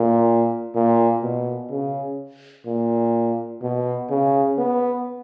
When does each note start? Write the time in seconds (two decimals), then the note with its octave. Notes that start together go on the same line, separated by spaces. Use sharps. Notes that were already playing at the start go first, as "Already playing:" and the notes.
Already playing: A#2
0.75 A#2
1.23 B2
1.70 C#3
2.66 A#2
3.62 B2
4.10 C#3
4.58 B3